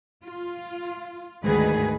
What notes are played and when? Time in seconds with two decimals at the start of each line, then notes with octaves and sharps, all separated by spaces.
0.22 F4
1.42 D2 G#2 D#3 G#4 B4